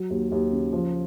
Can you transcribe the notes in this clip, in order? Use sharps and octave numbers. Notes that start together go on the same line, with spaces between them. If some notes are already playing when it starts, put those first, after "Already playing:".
Already playing: F#3
D#2
D#2
C#3
F3